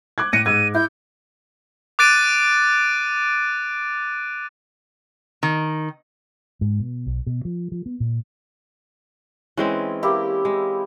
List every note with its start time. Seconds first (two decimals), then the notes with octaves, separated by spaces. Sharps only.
0.18 D6 F#6 G#6
0.33 A2 A#6 C#7 D#7
0.46 G#2 E6 G#6 D#7
0.75 E4 G6
1.99 D6 F#6 A6 D7 D#7
5.43 D#3
6.61 G#2
6.80 B2
7.06 B1
7.27 B2
7.45 F3
7.72 F3
7.86 B3
8.00 A#2
9.57 E3 G#3 C4 C#4
10.03 A#3 E4 G4
10.45 G#3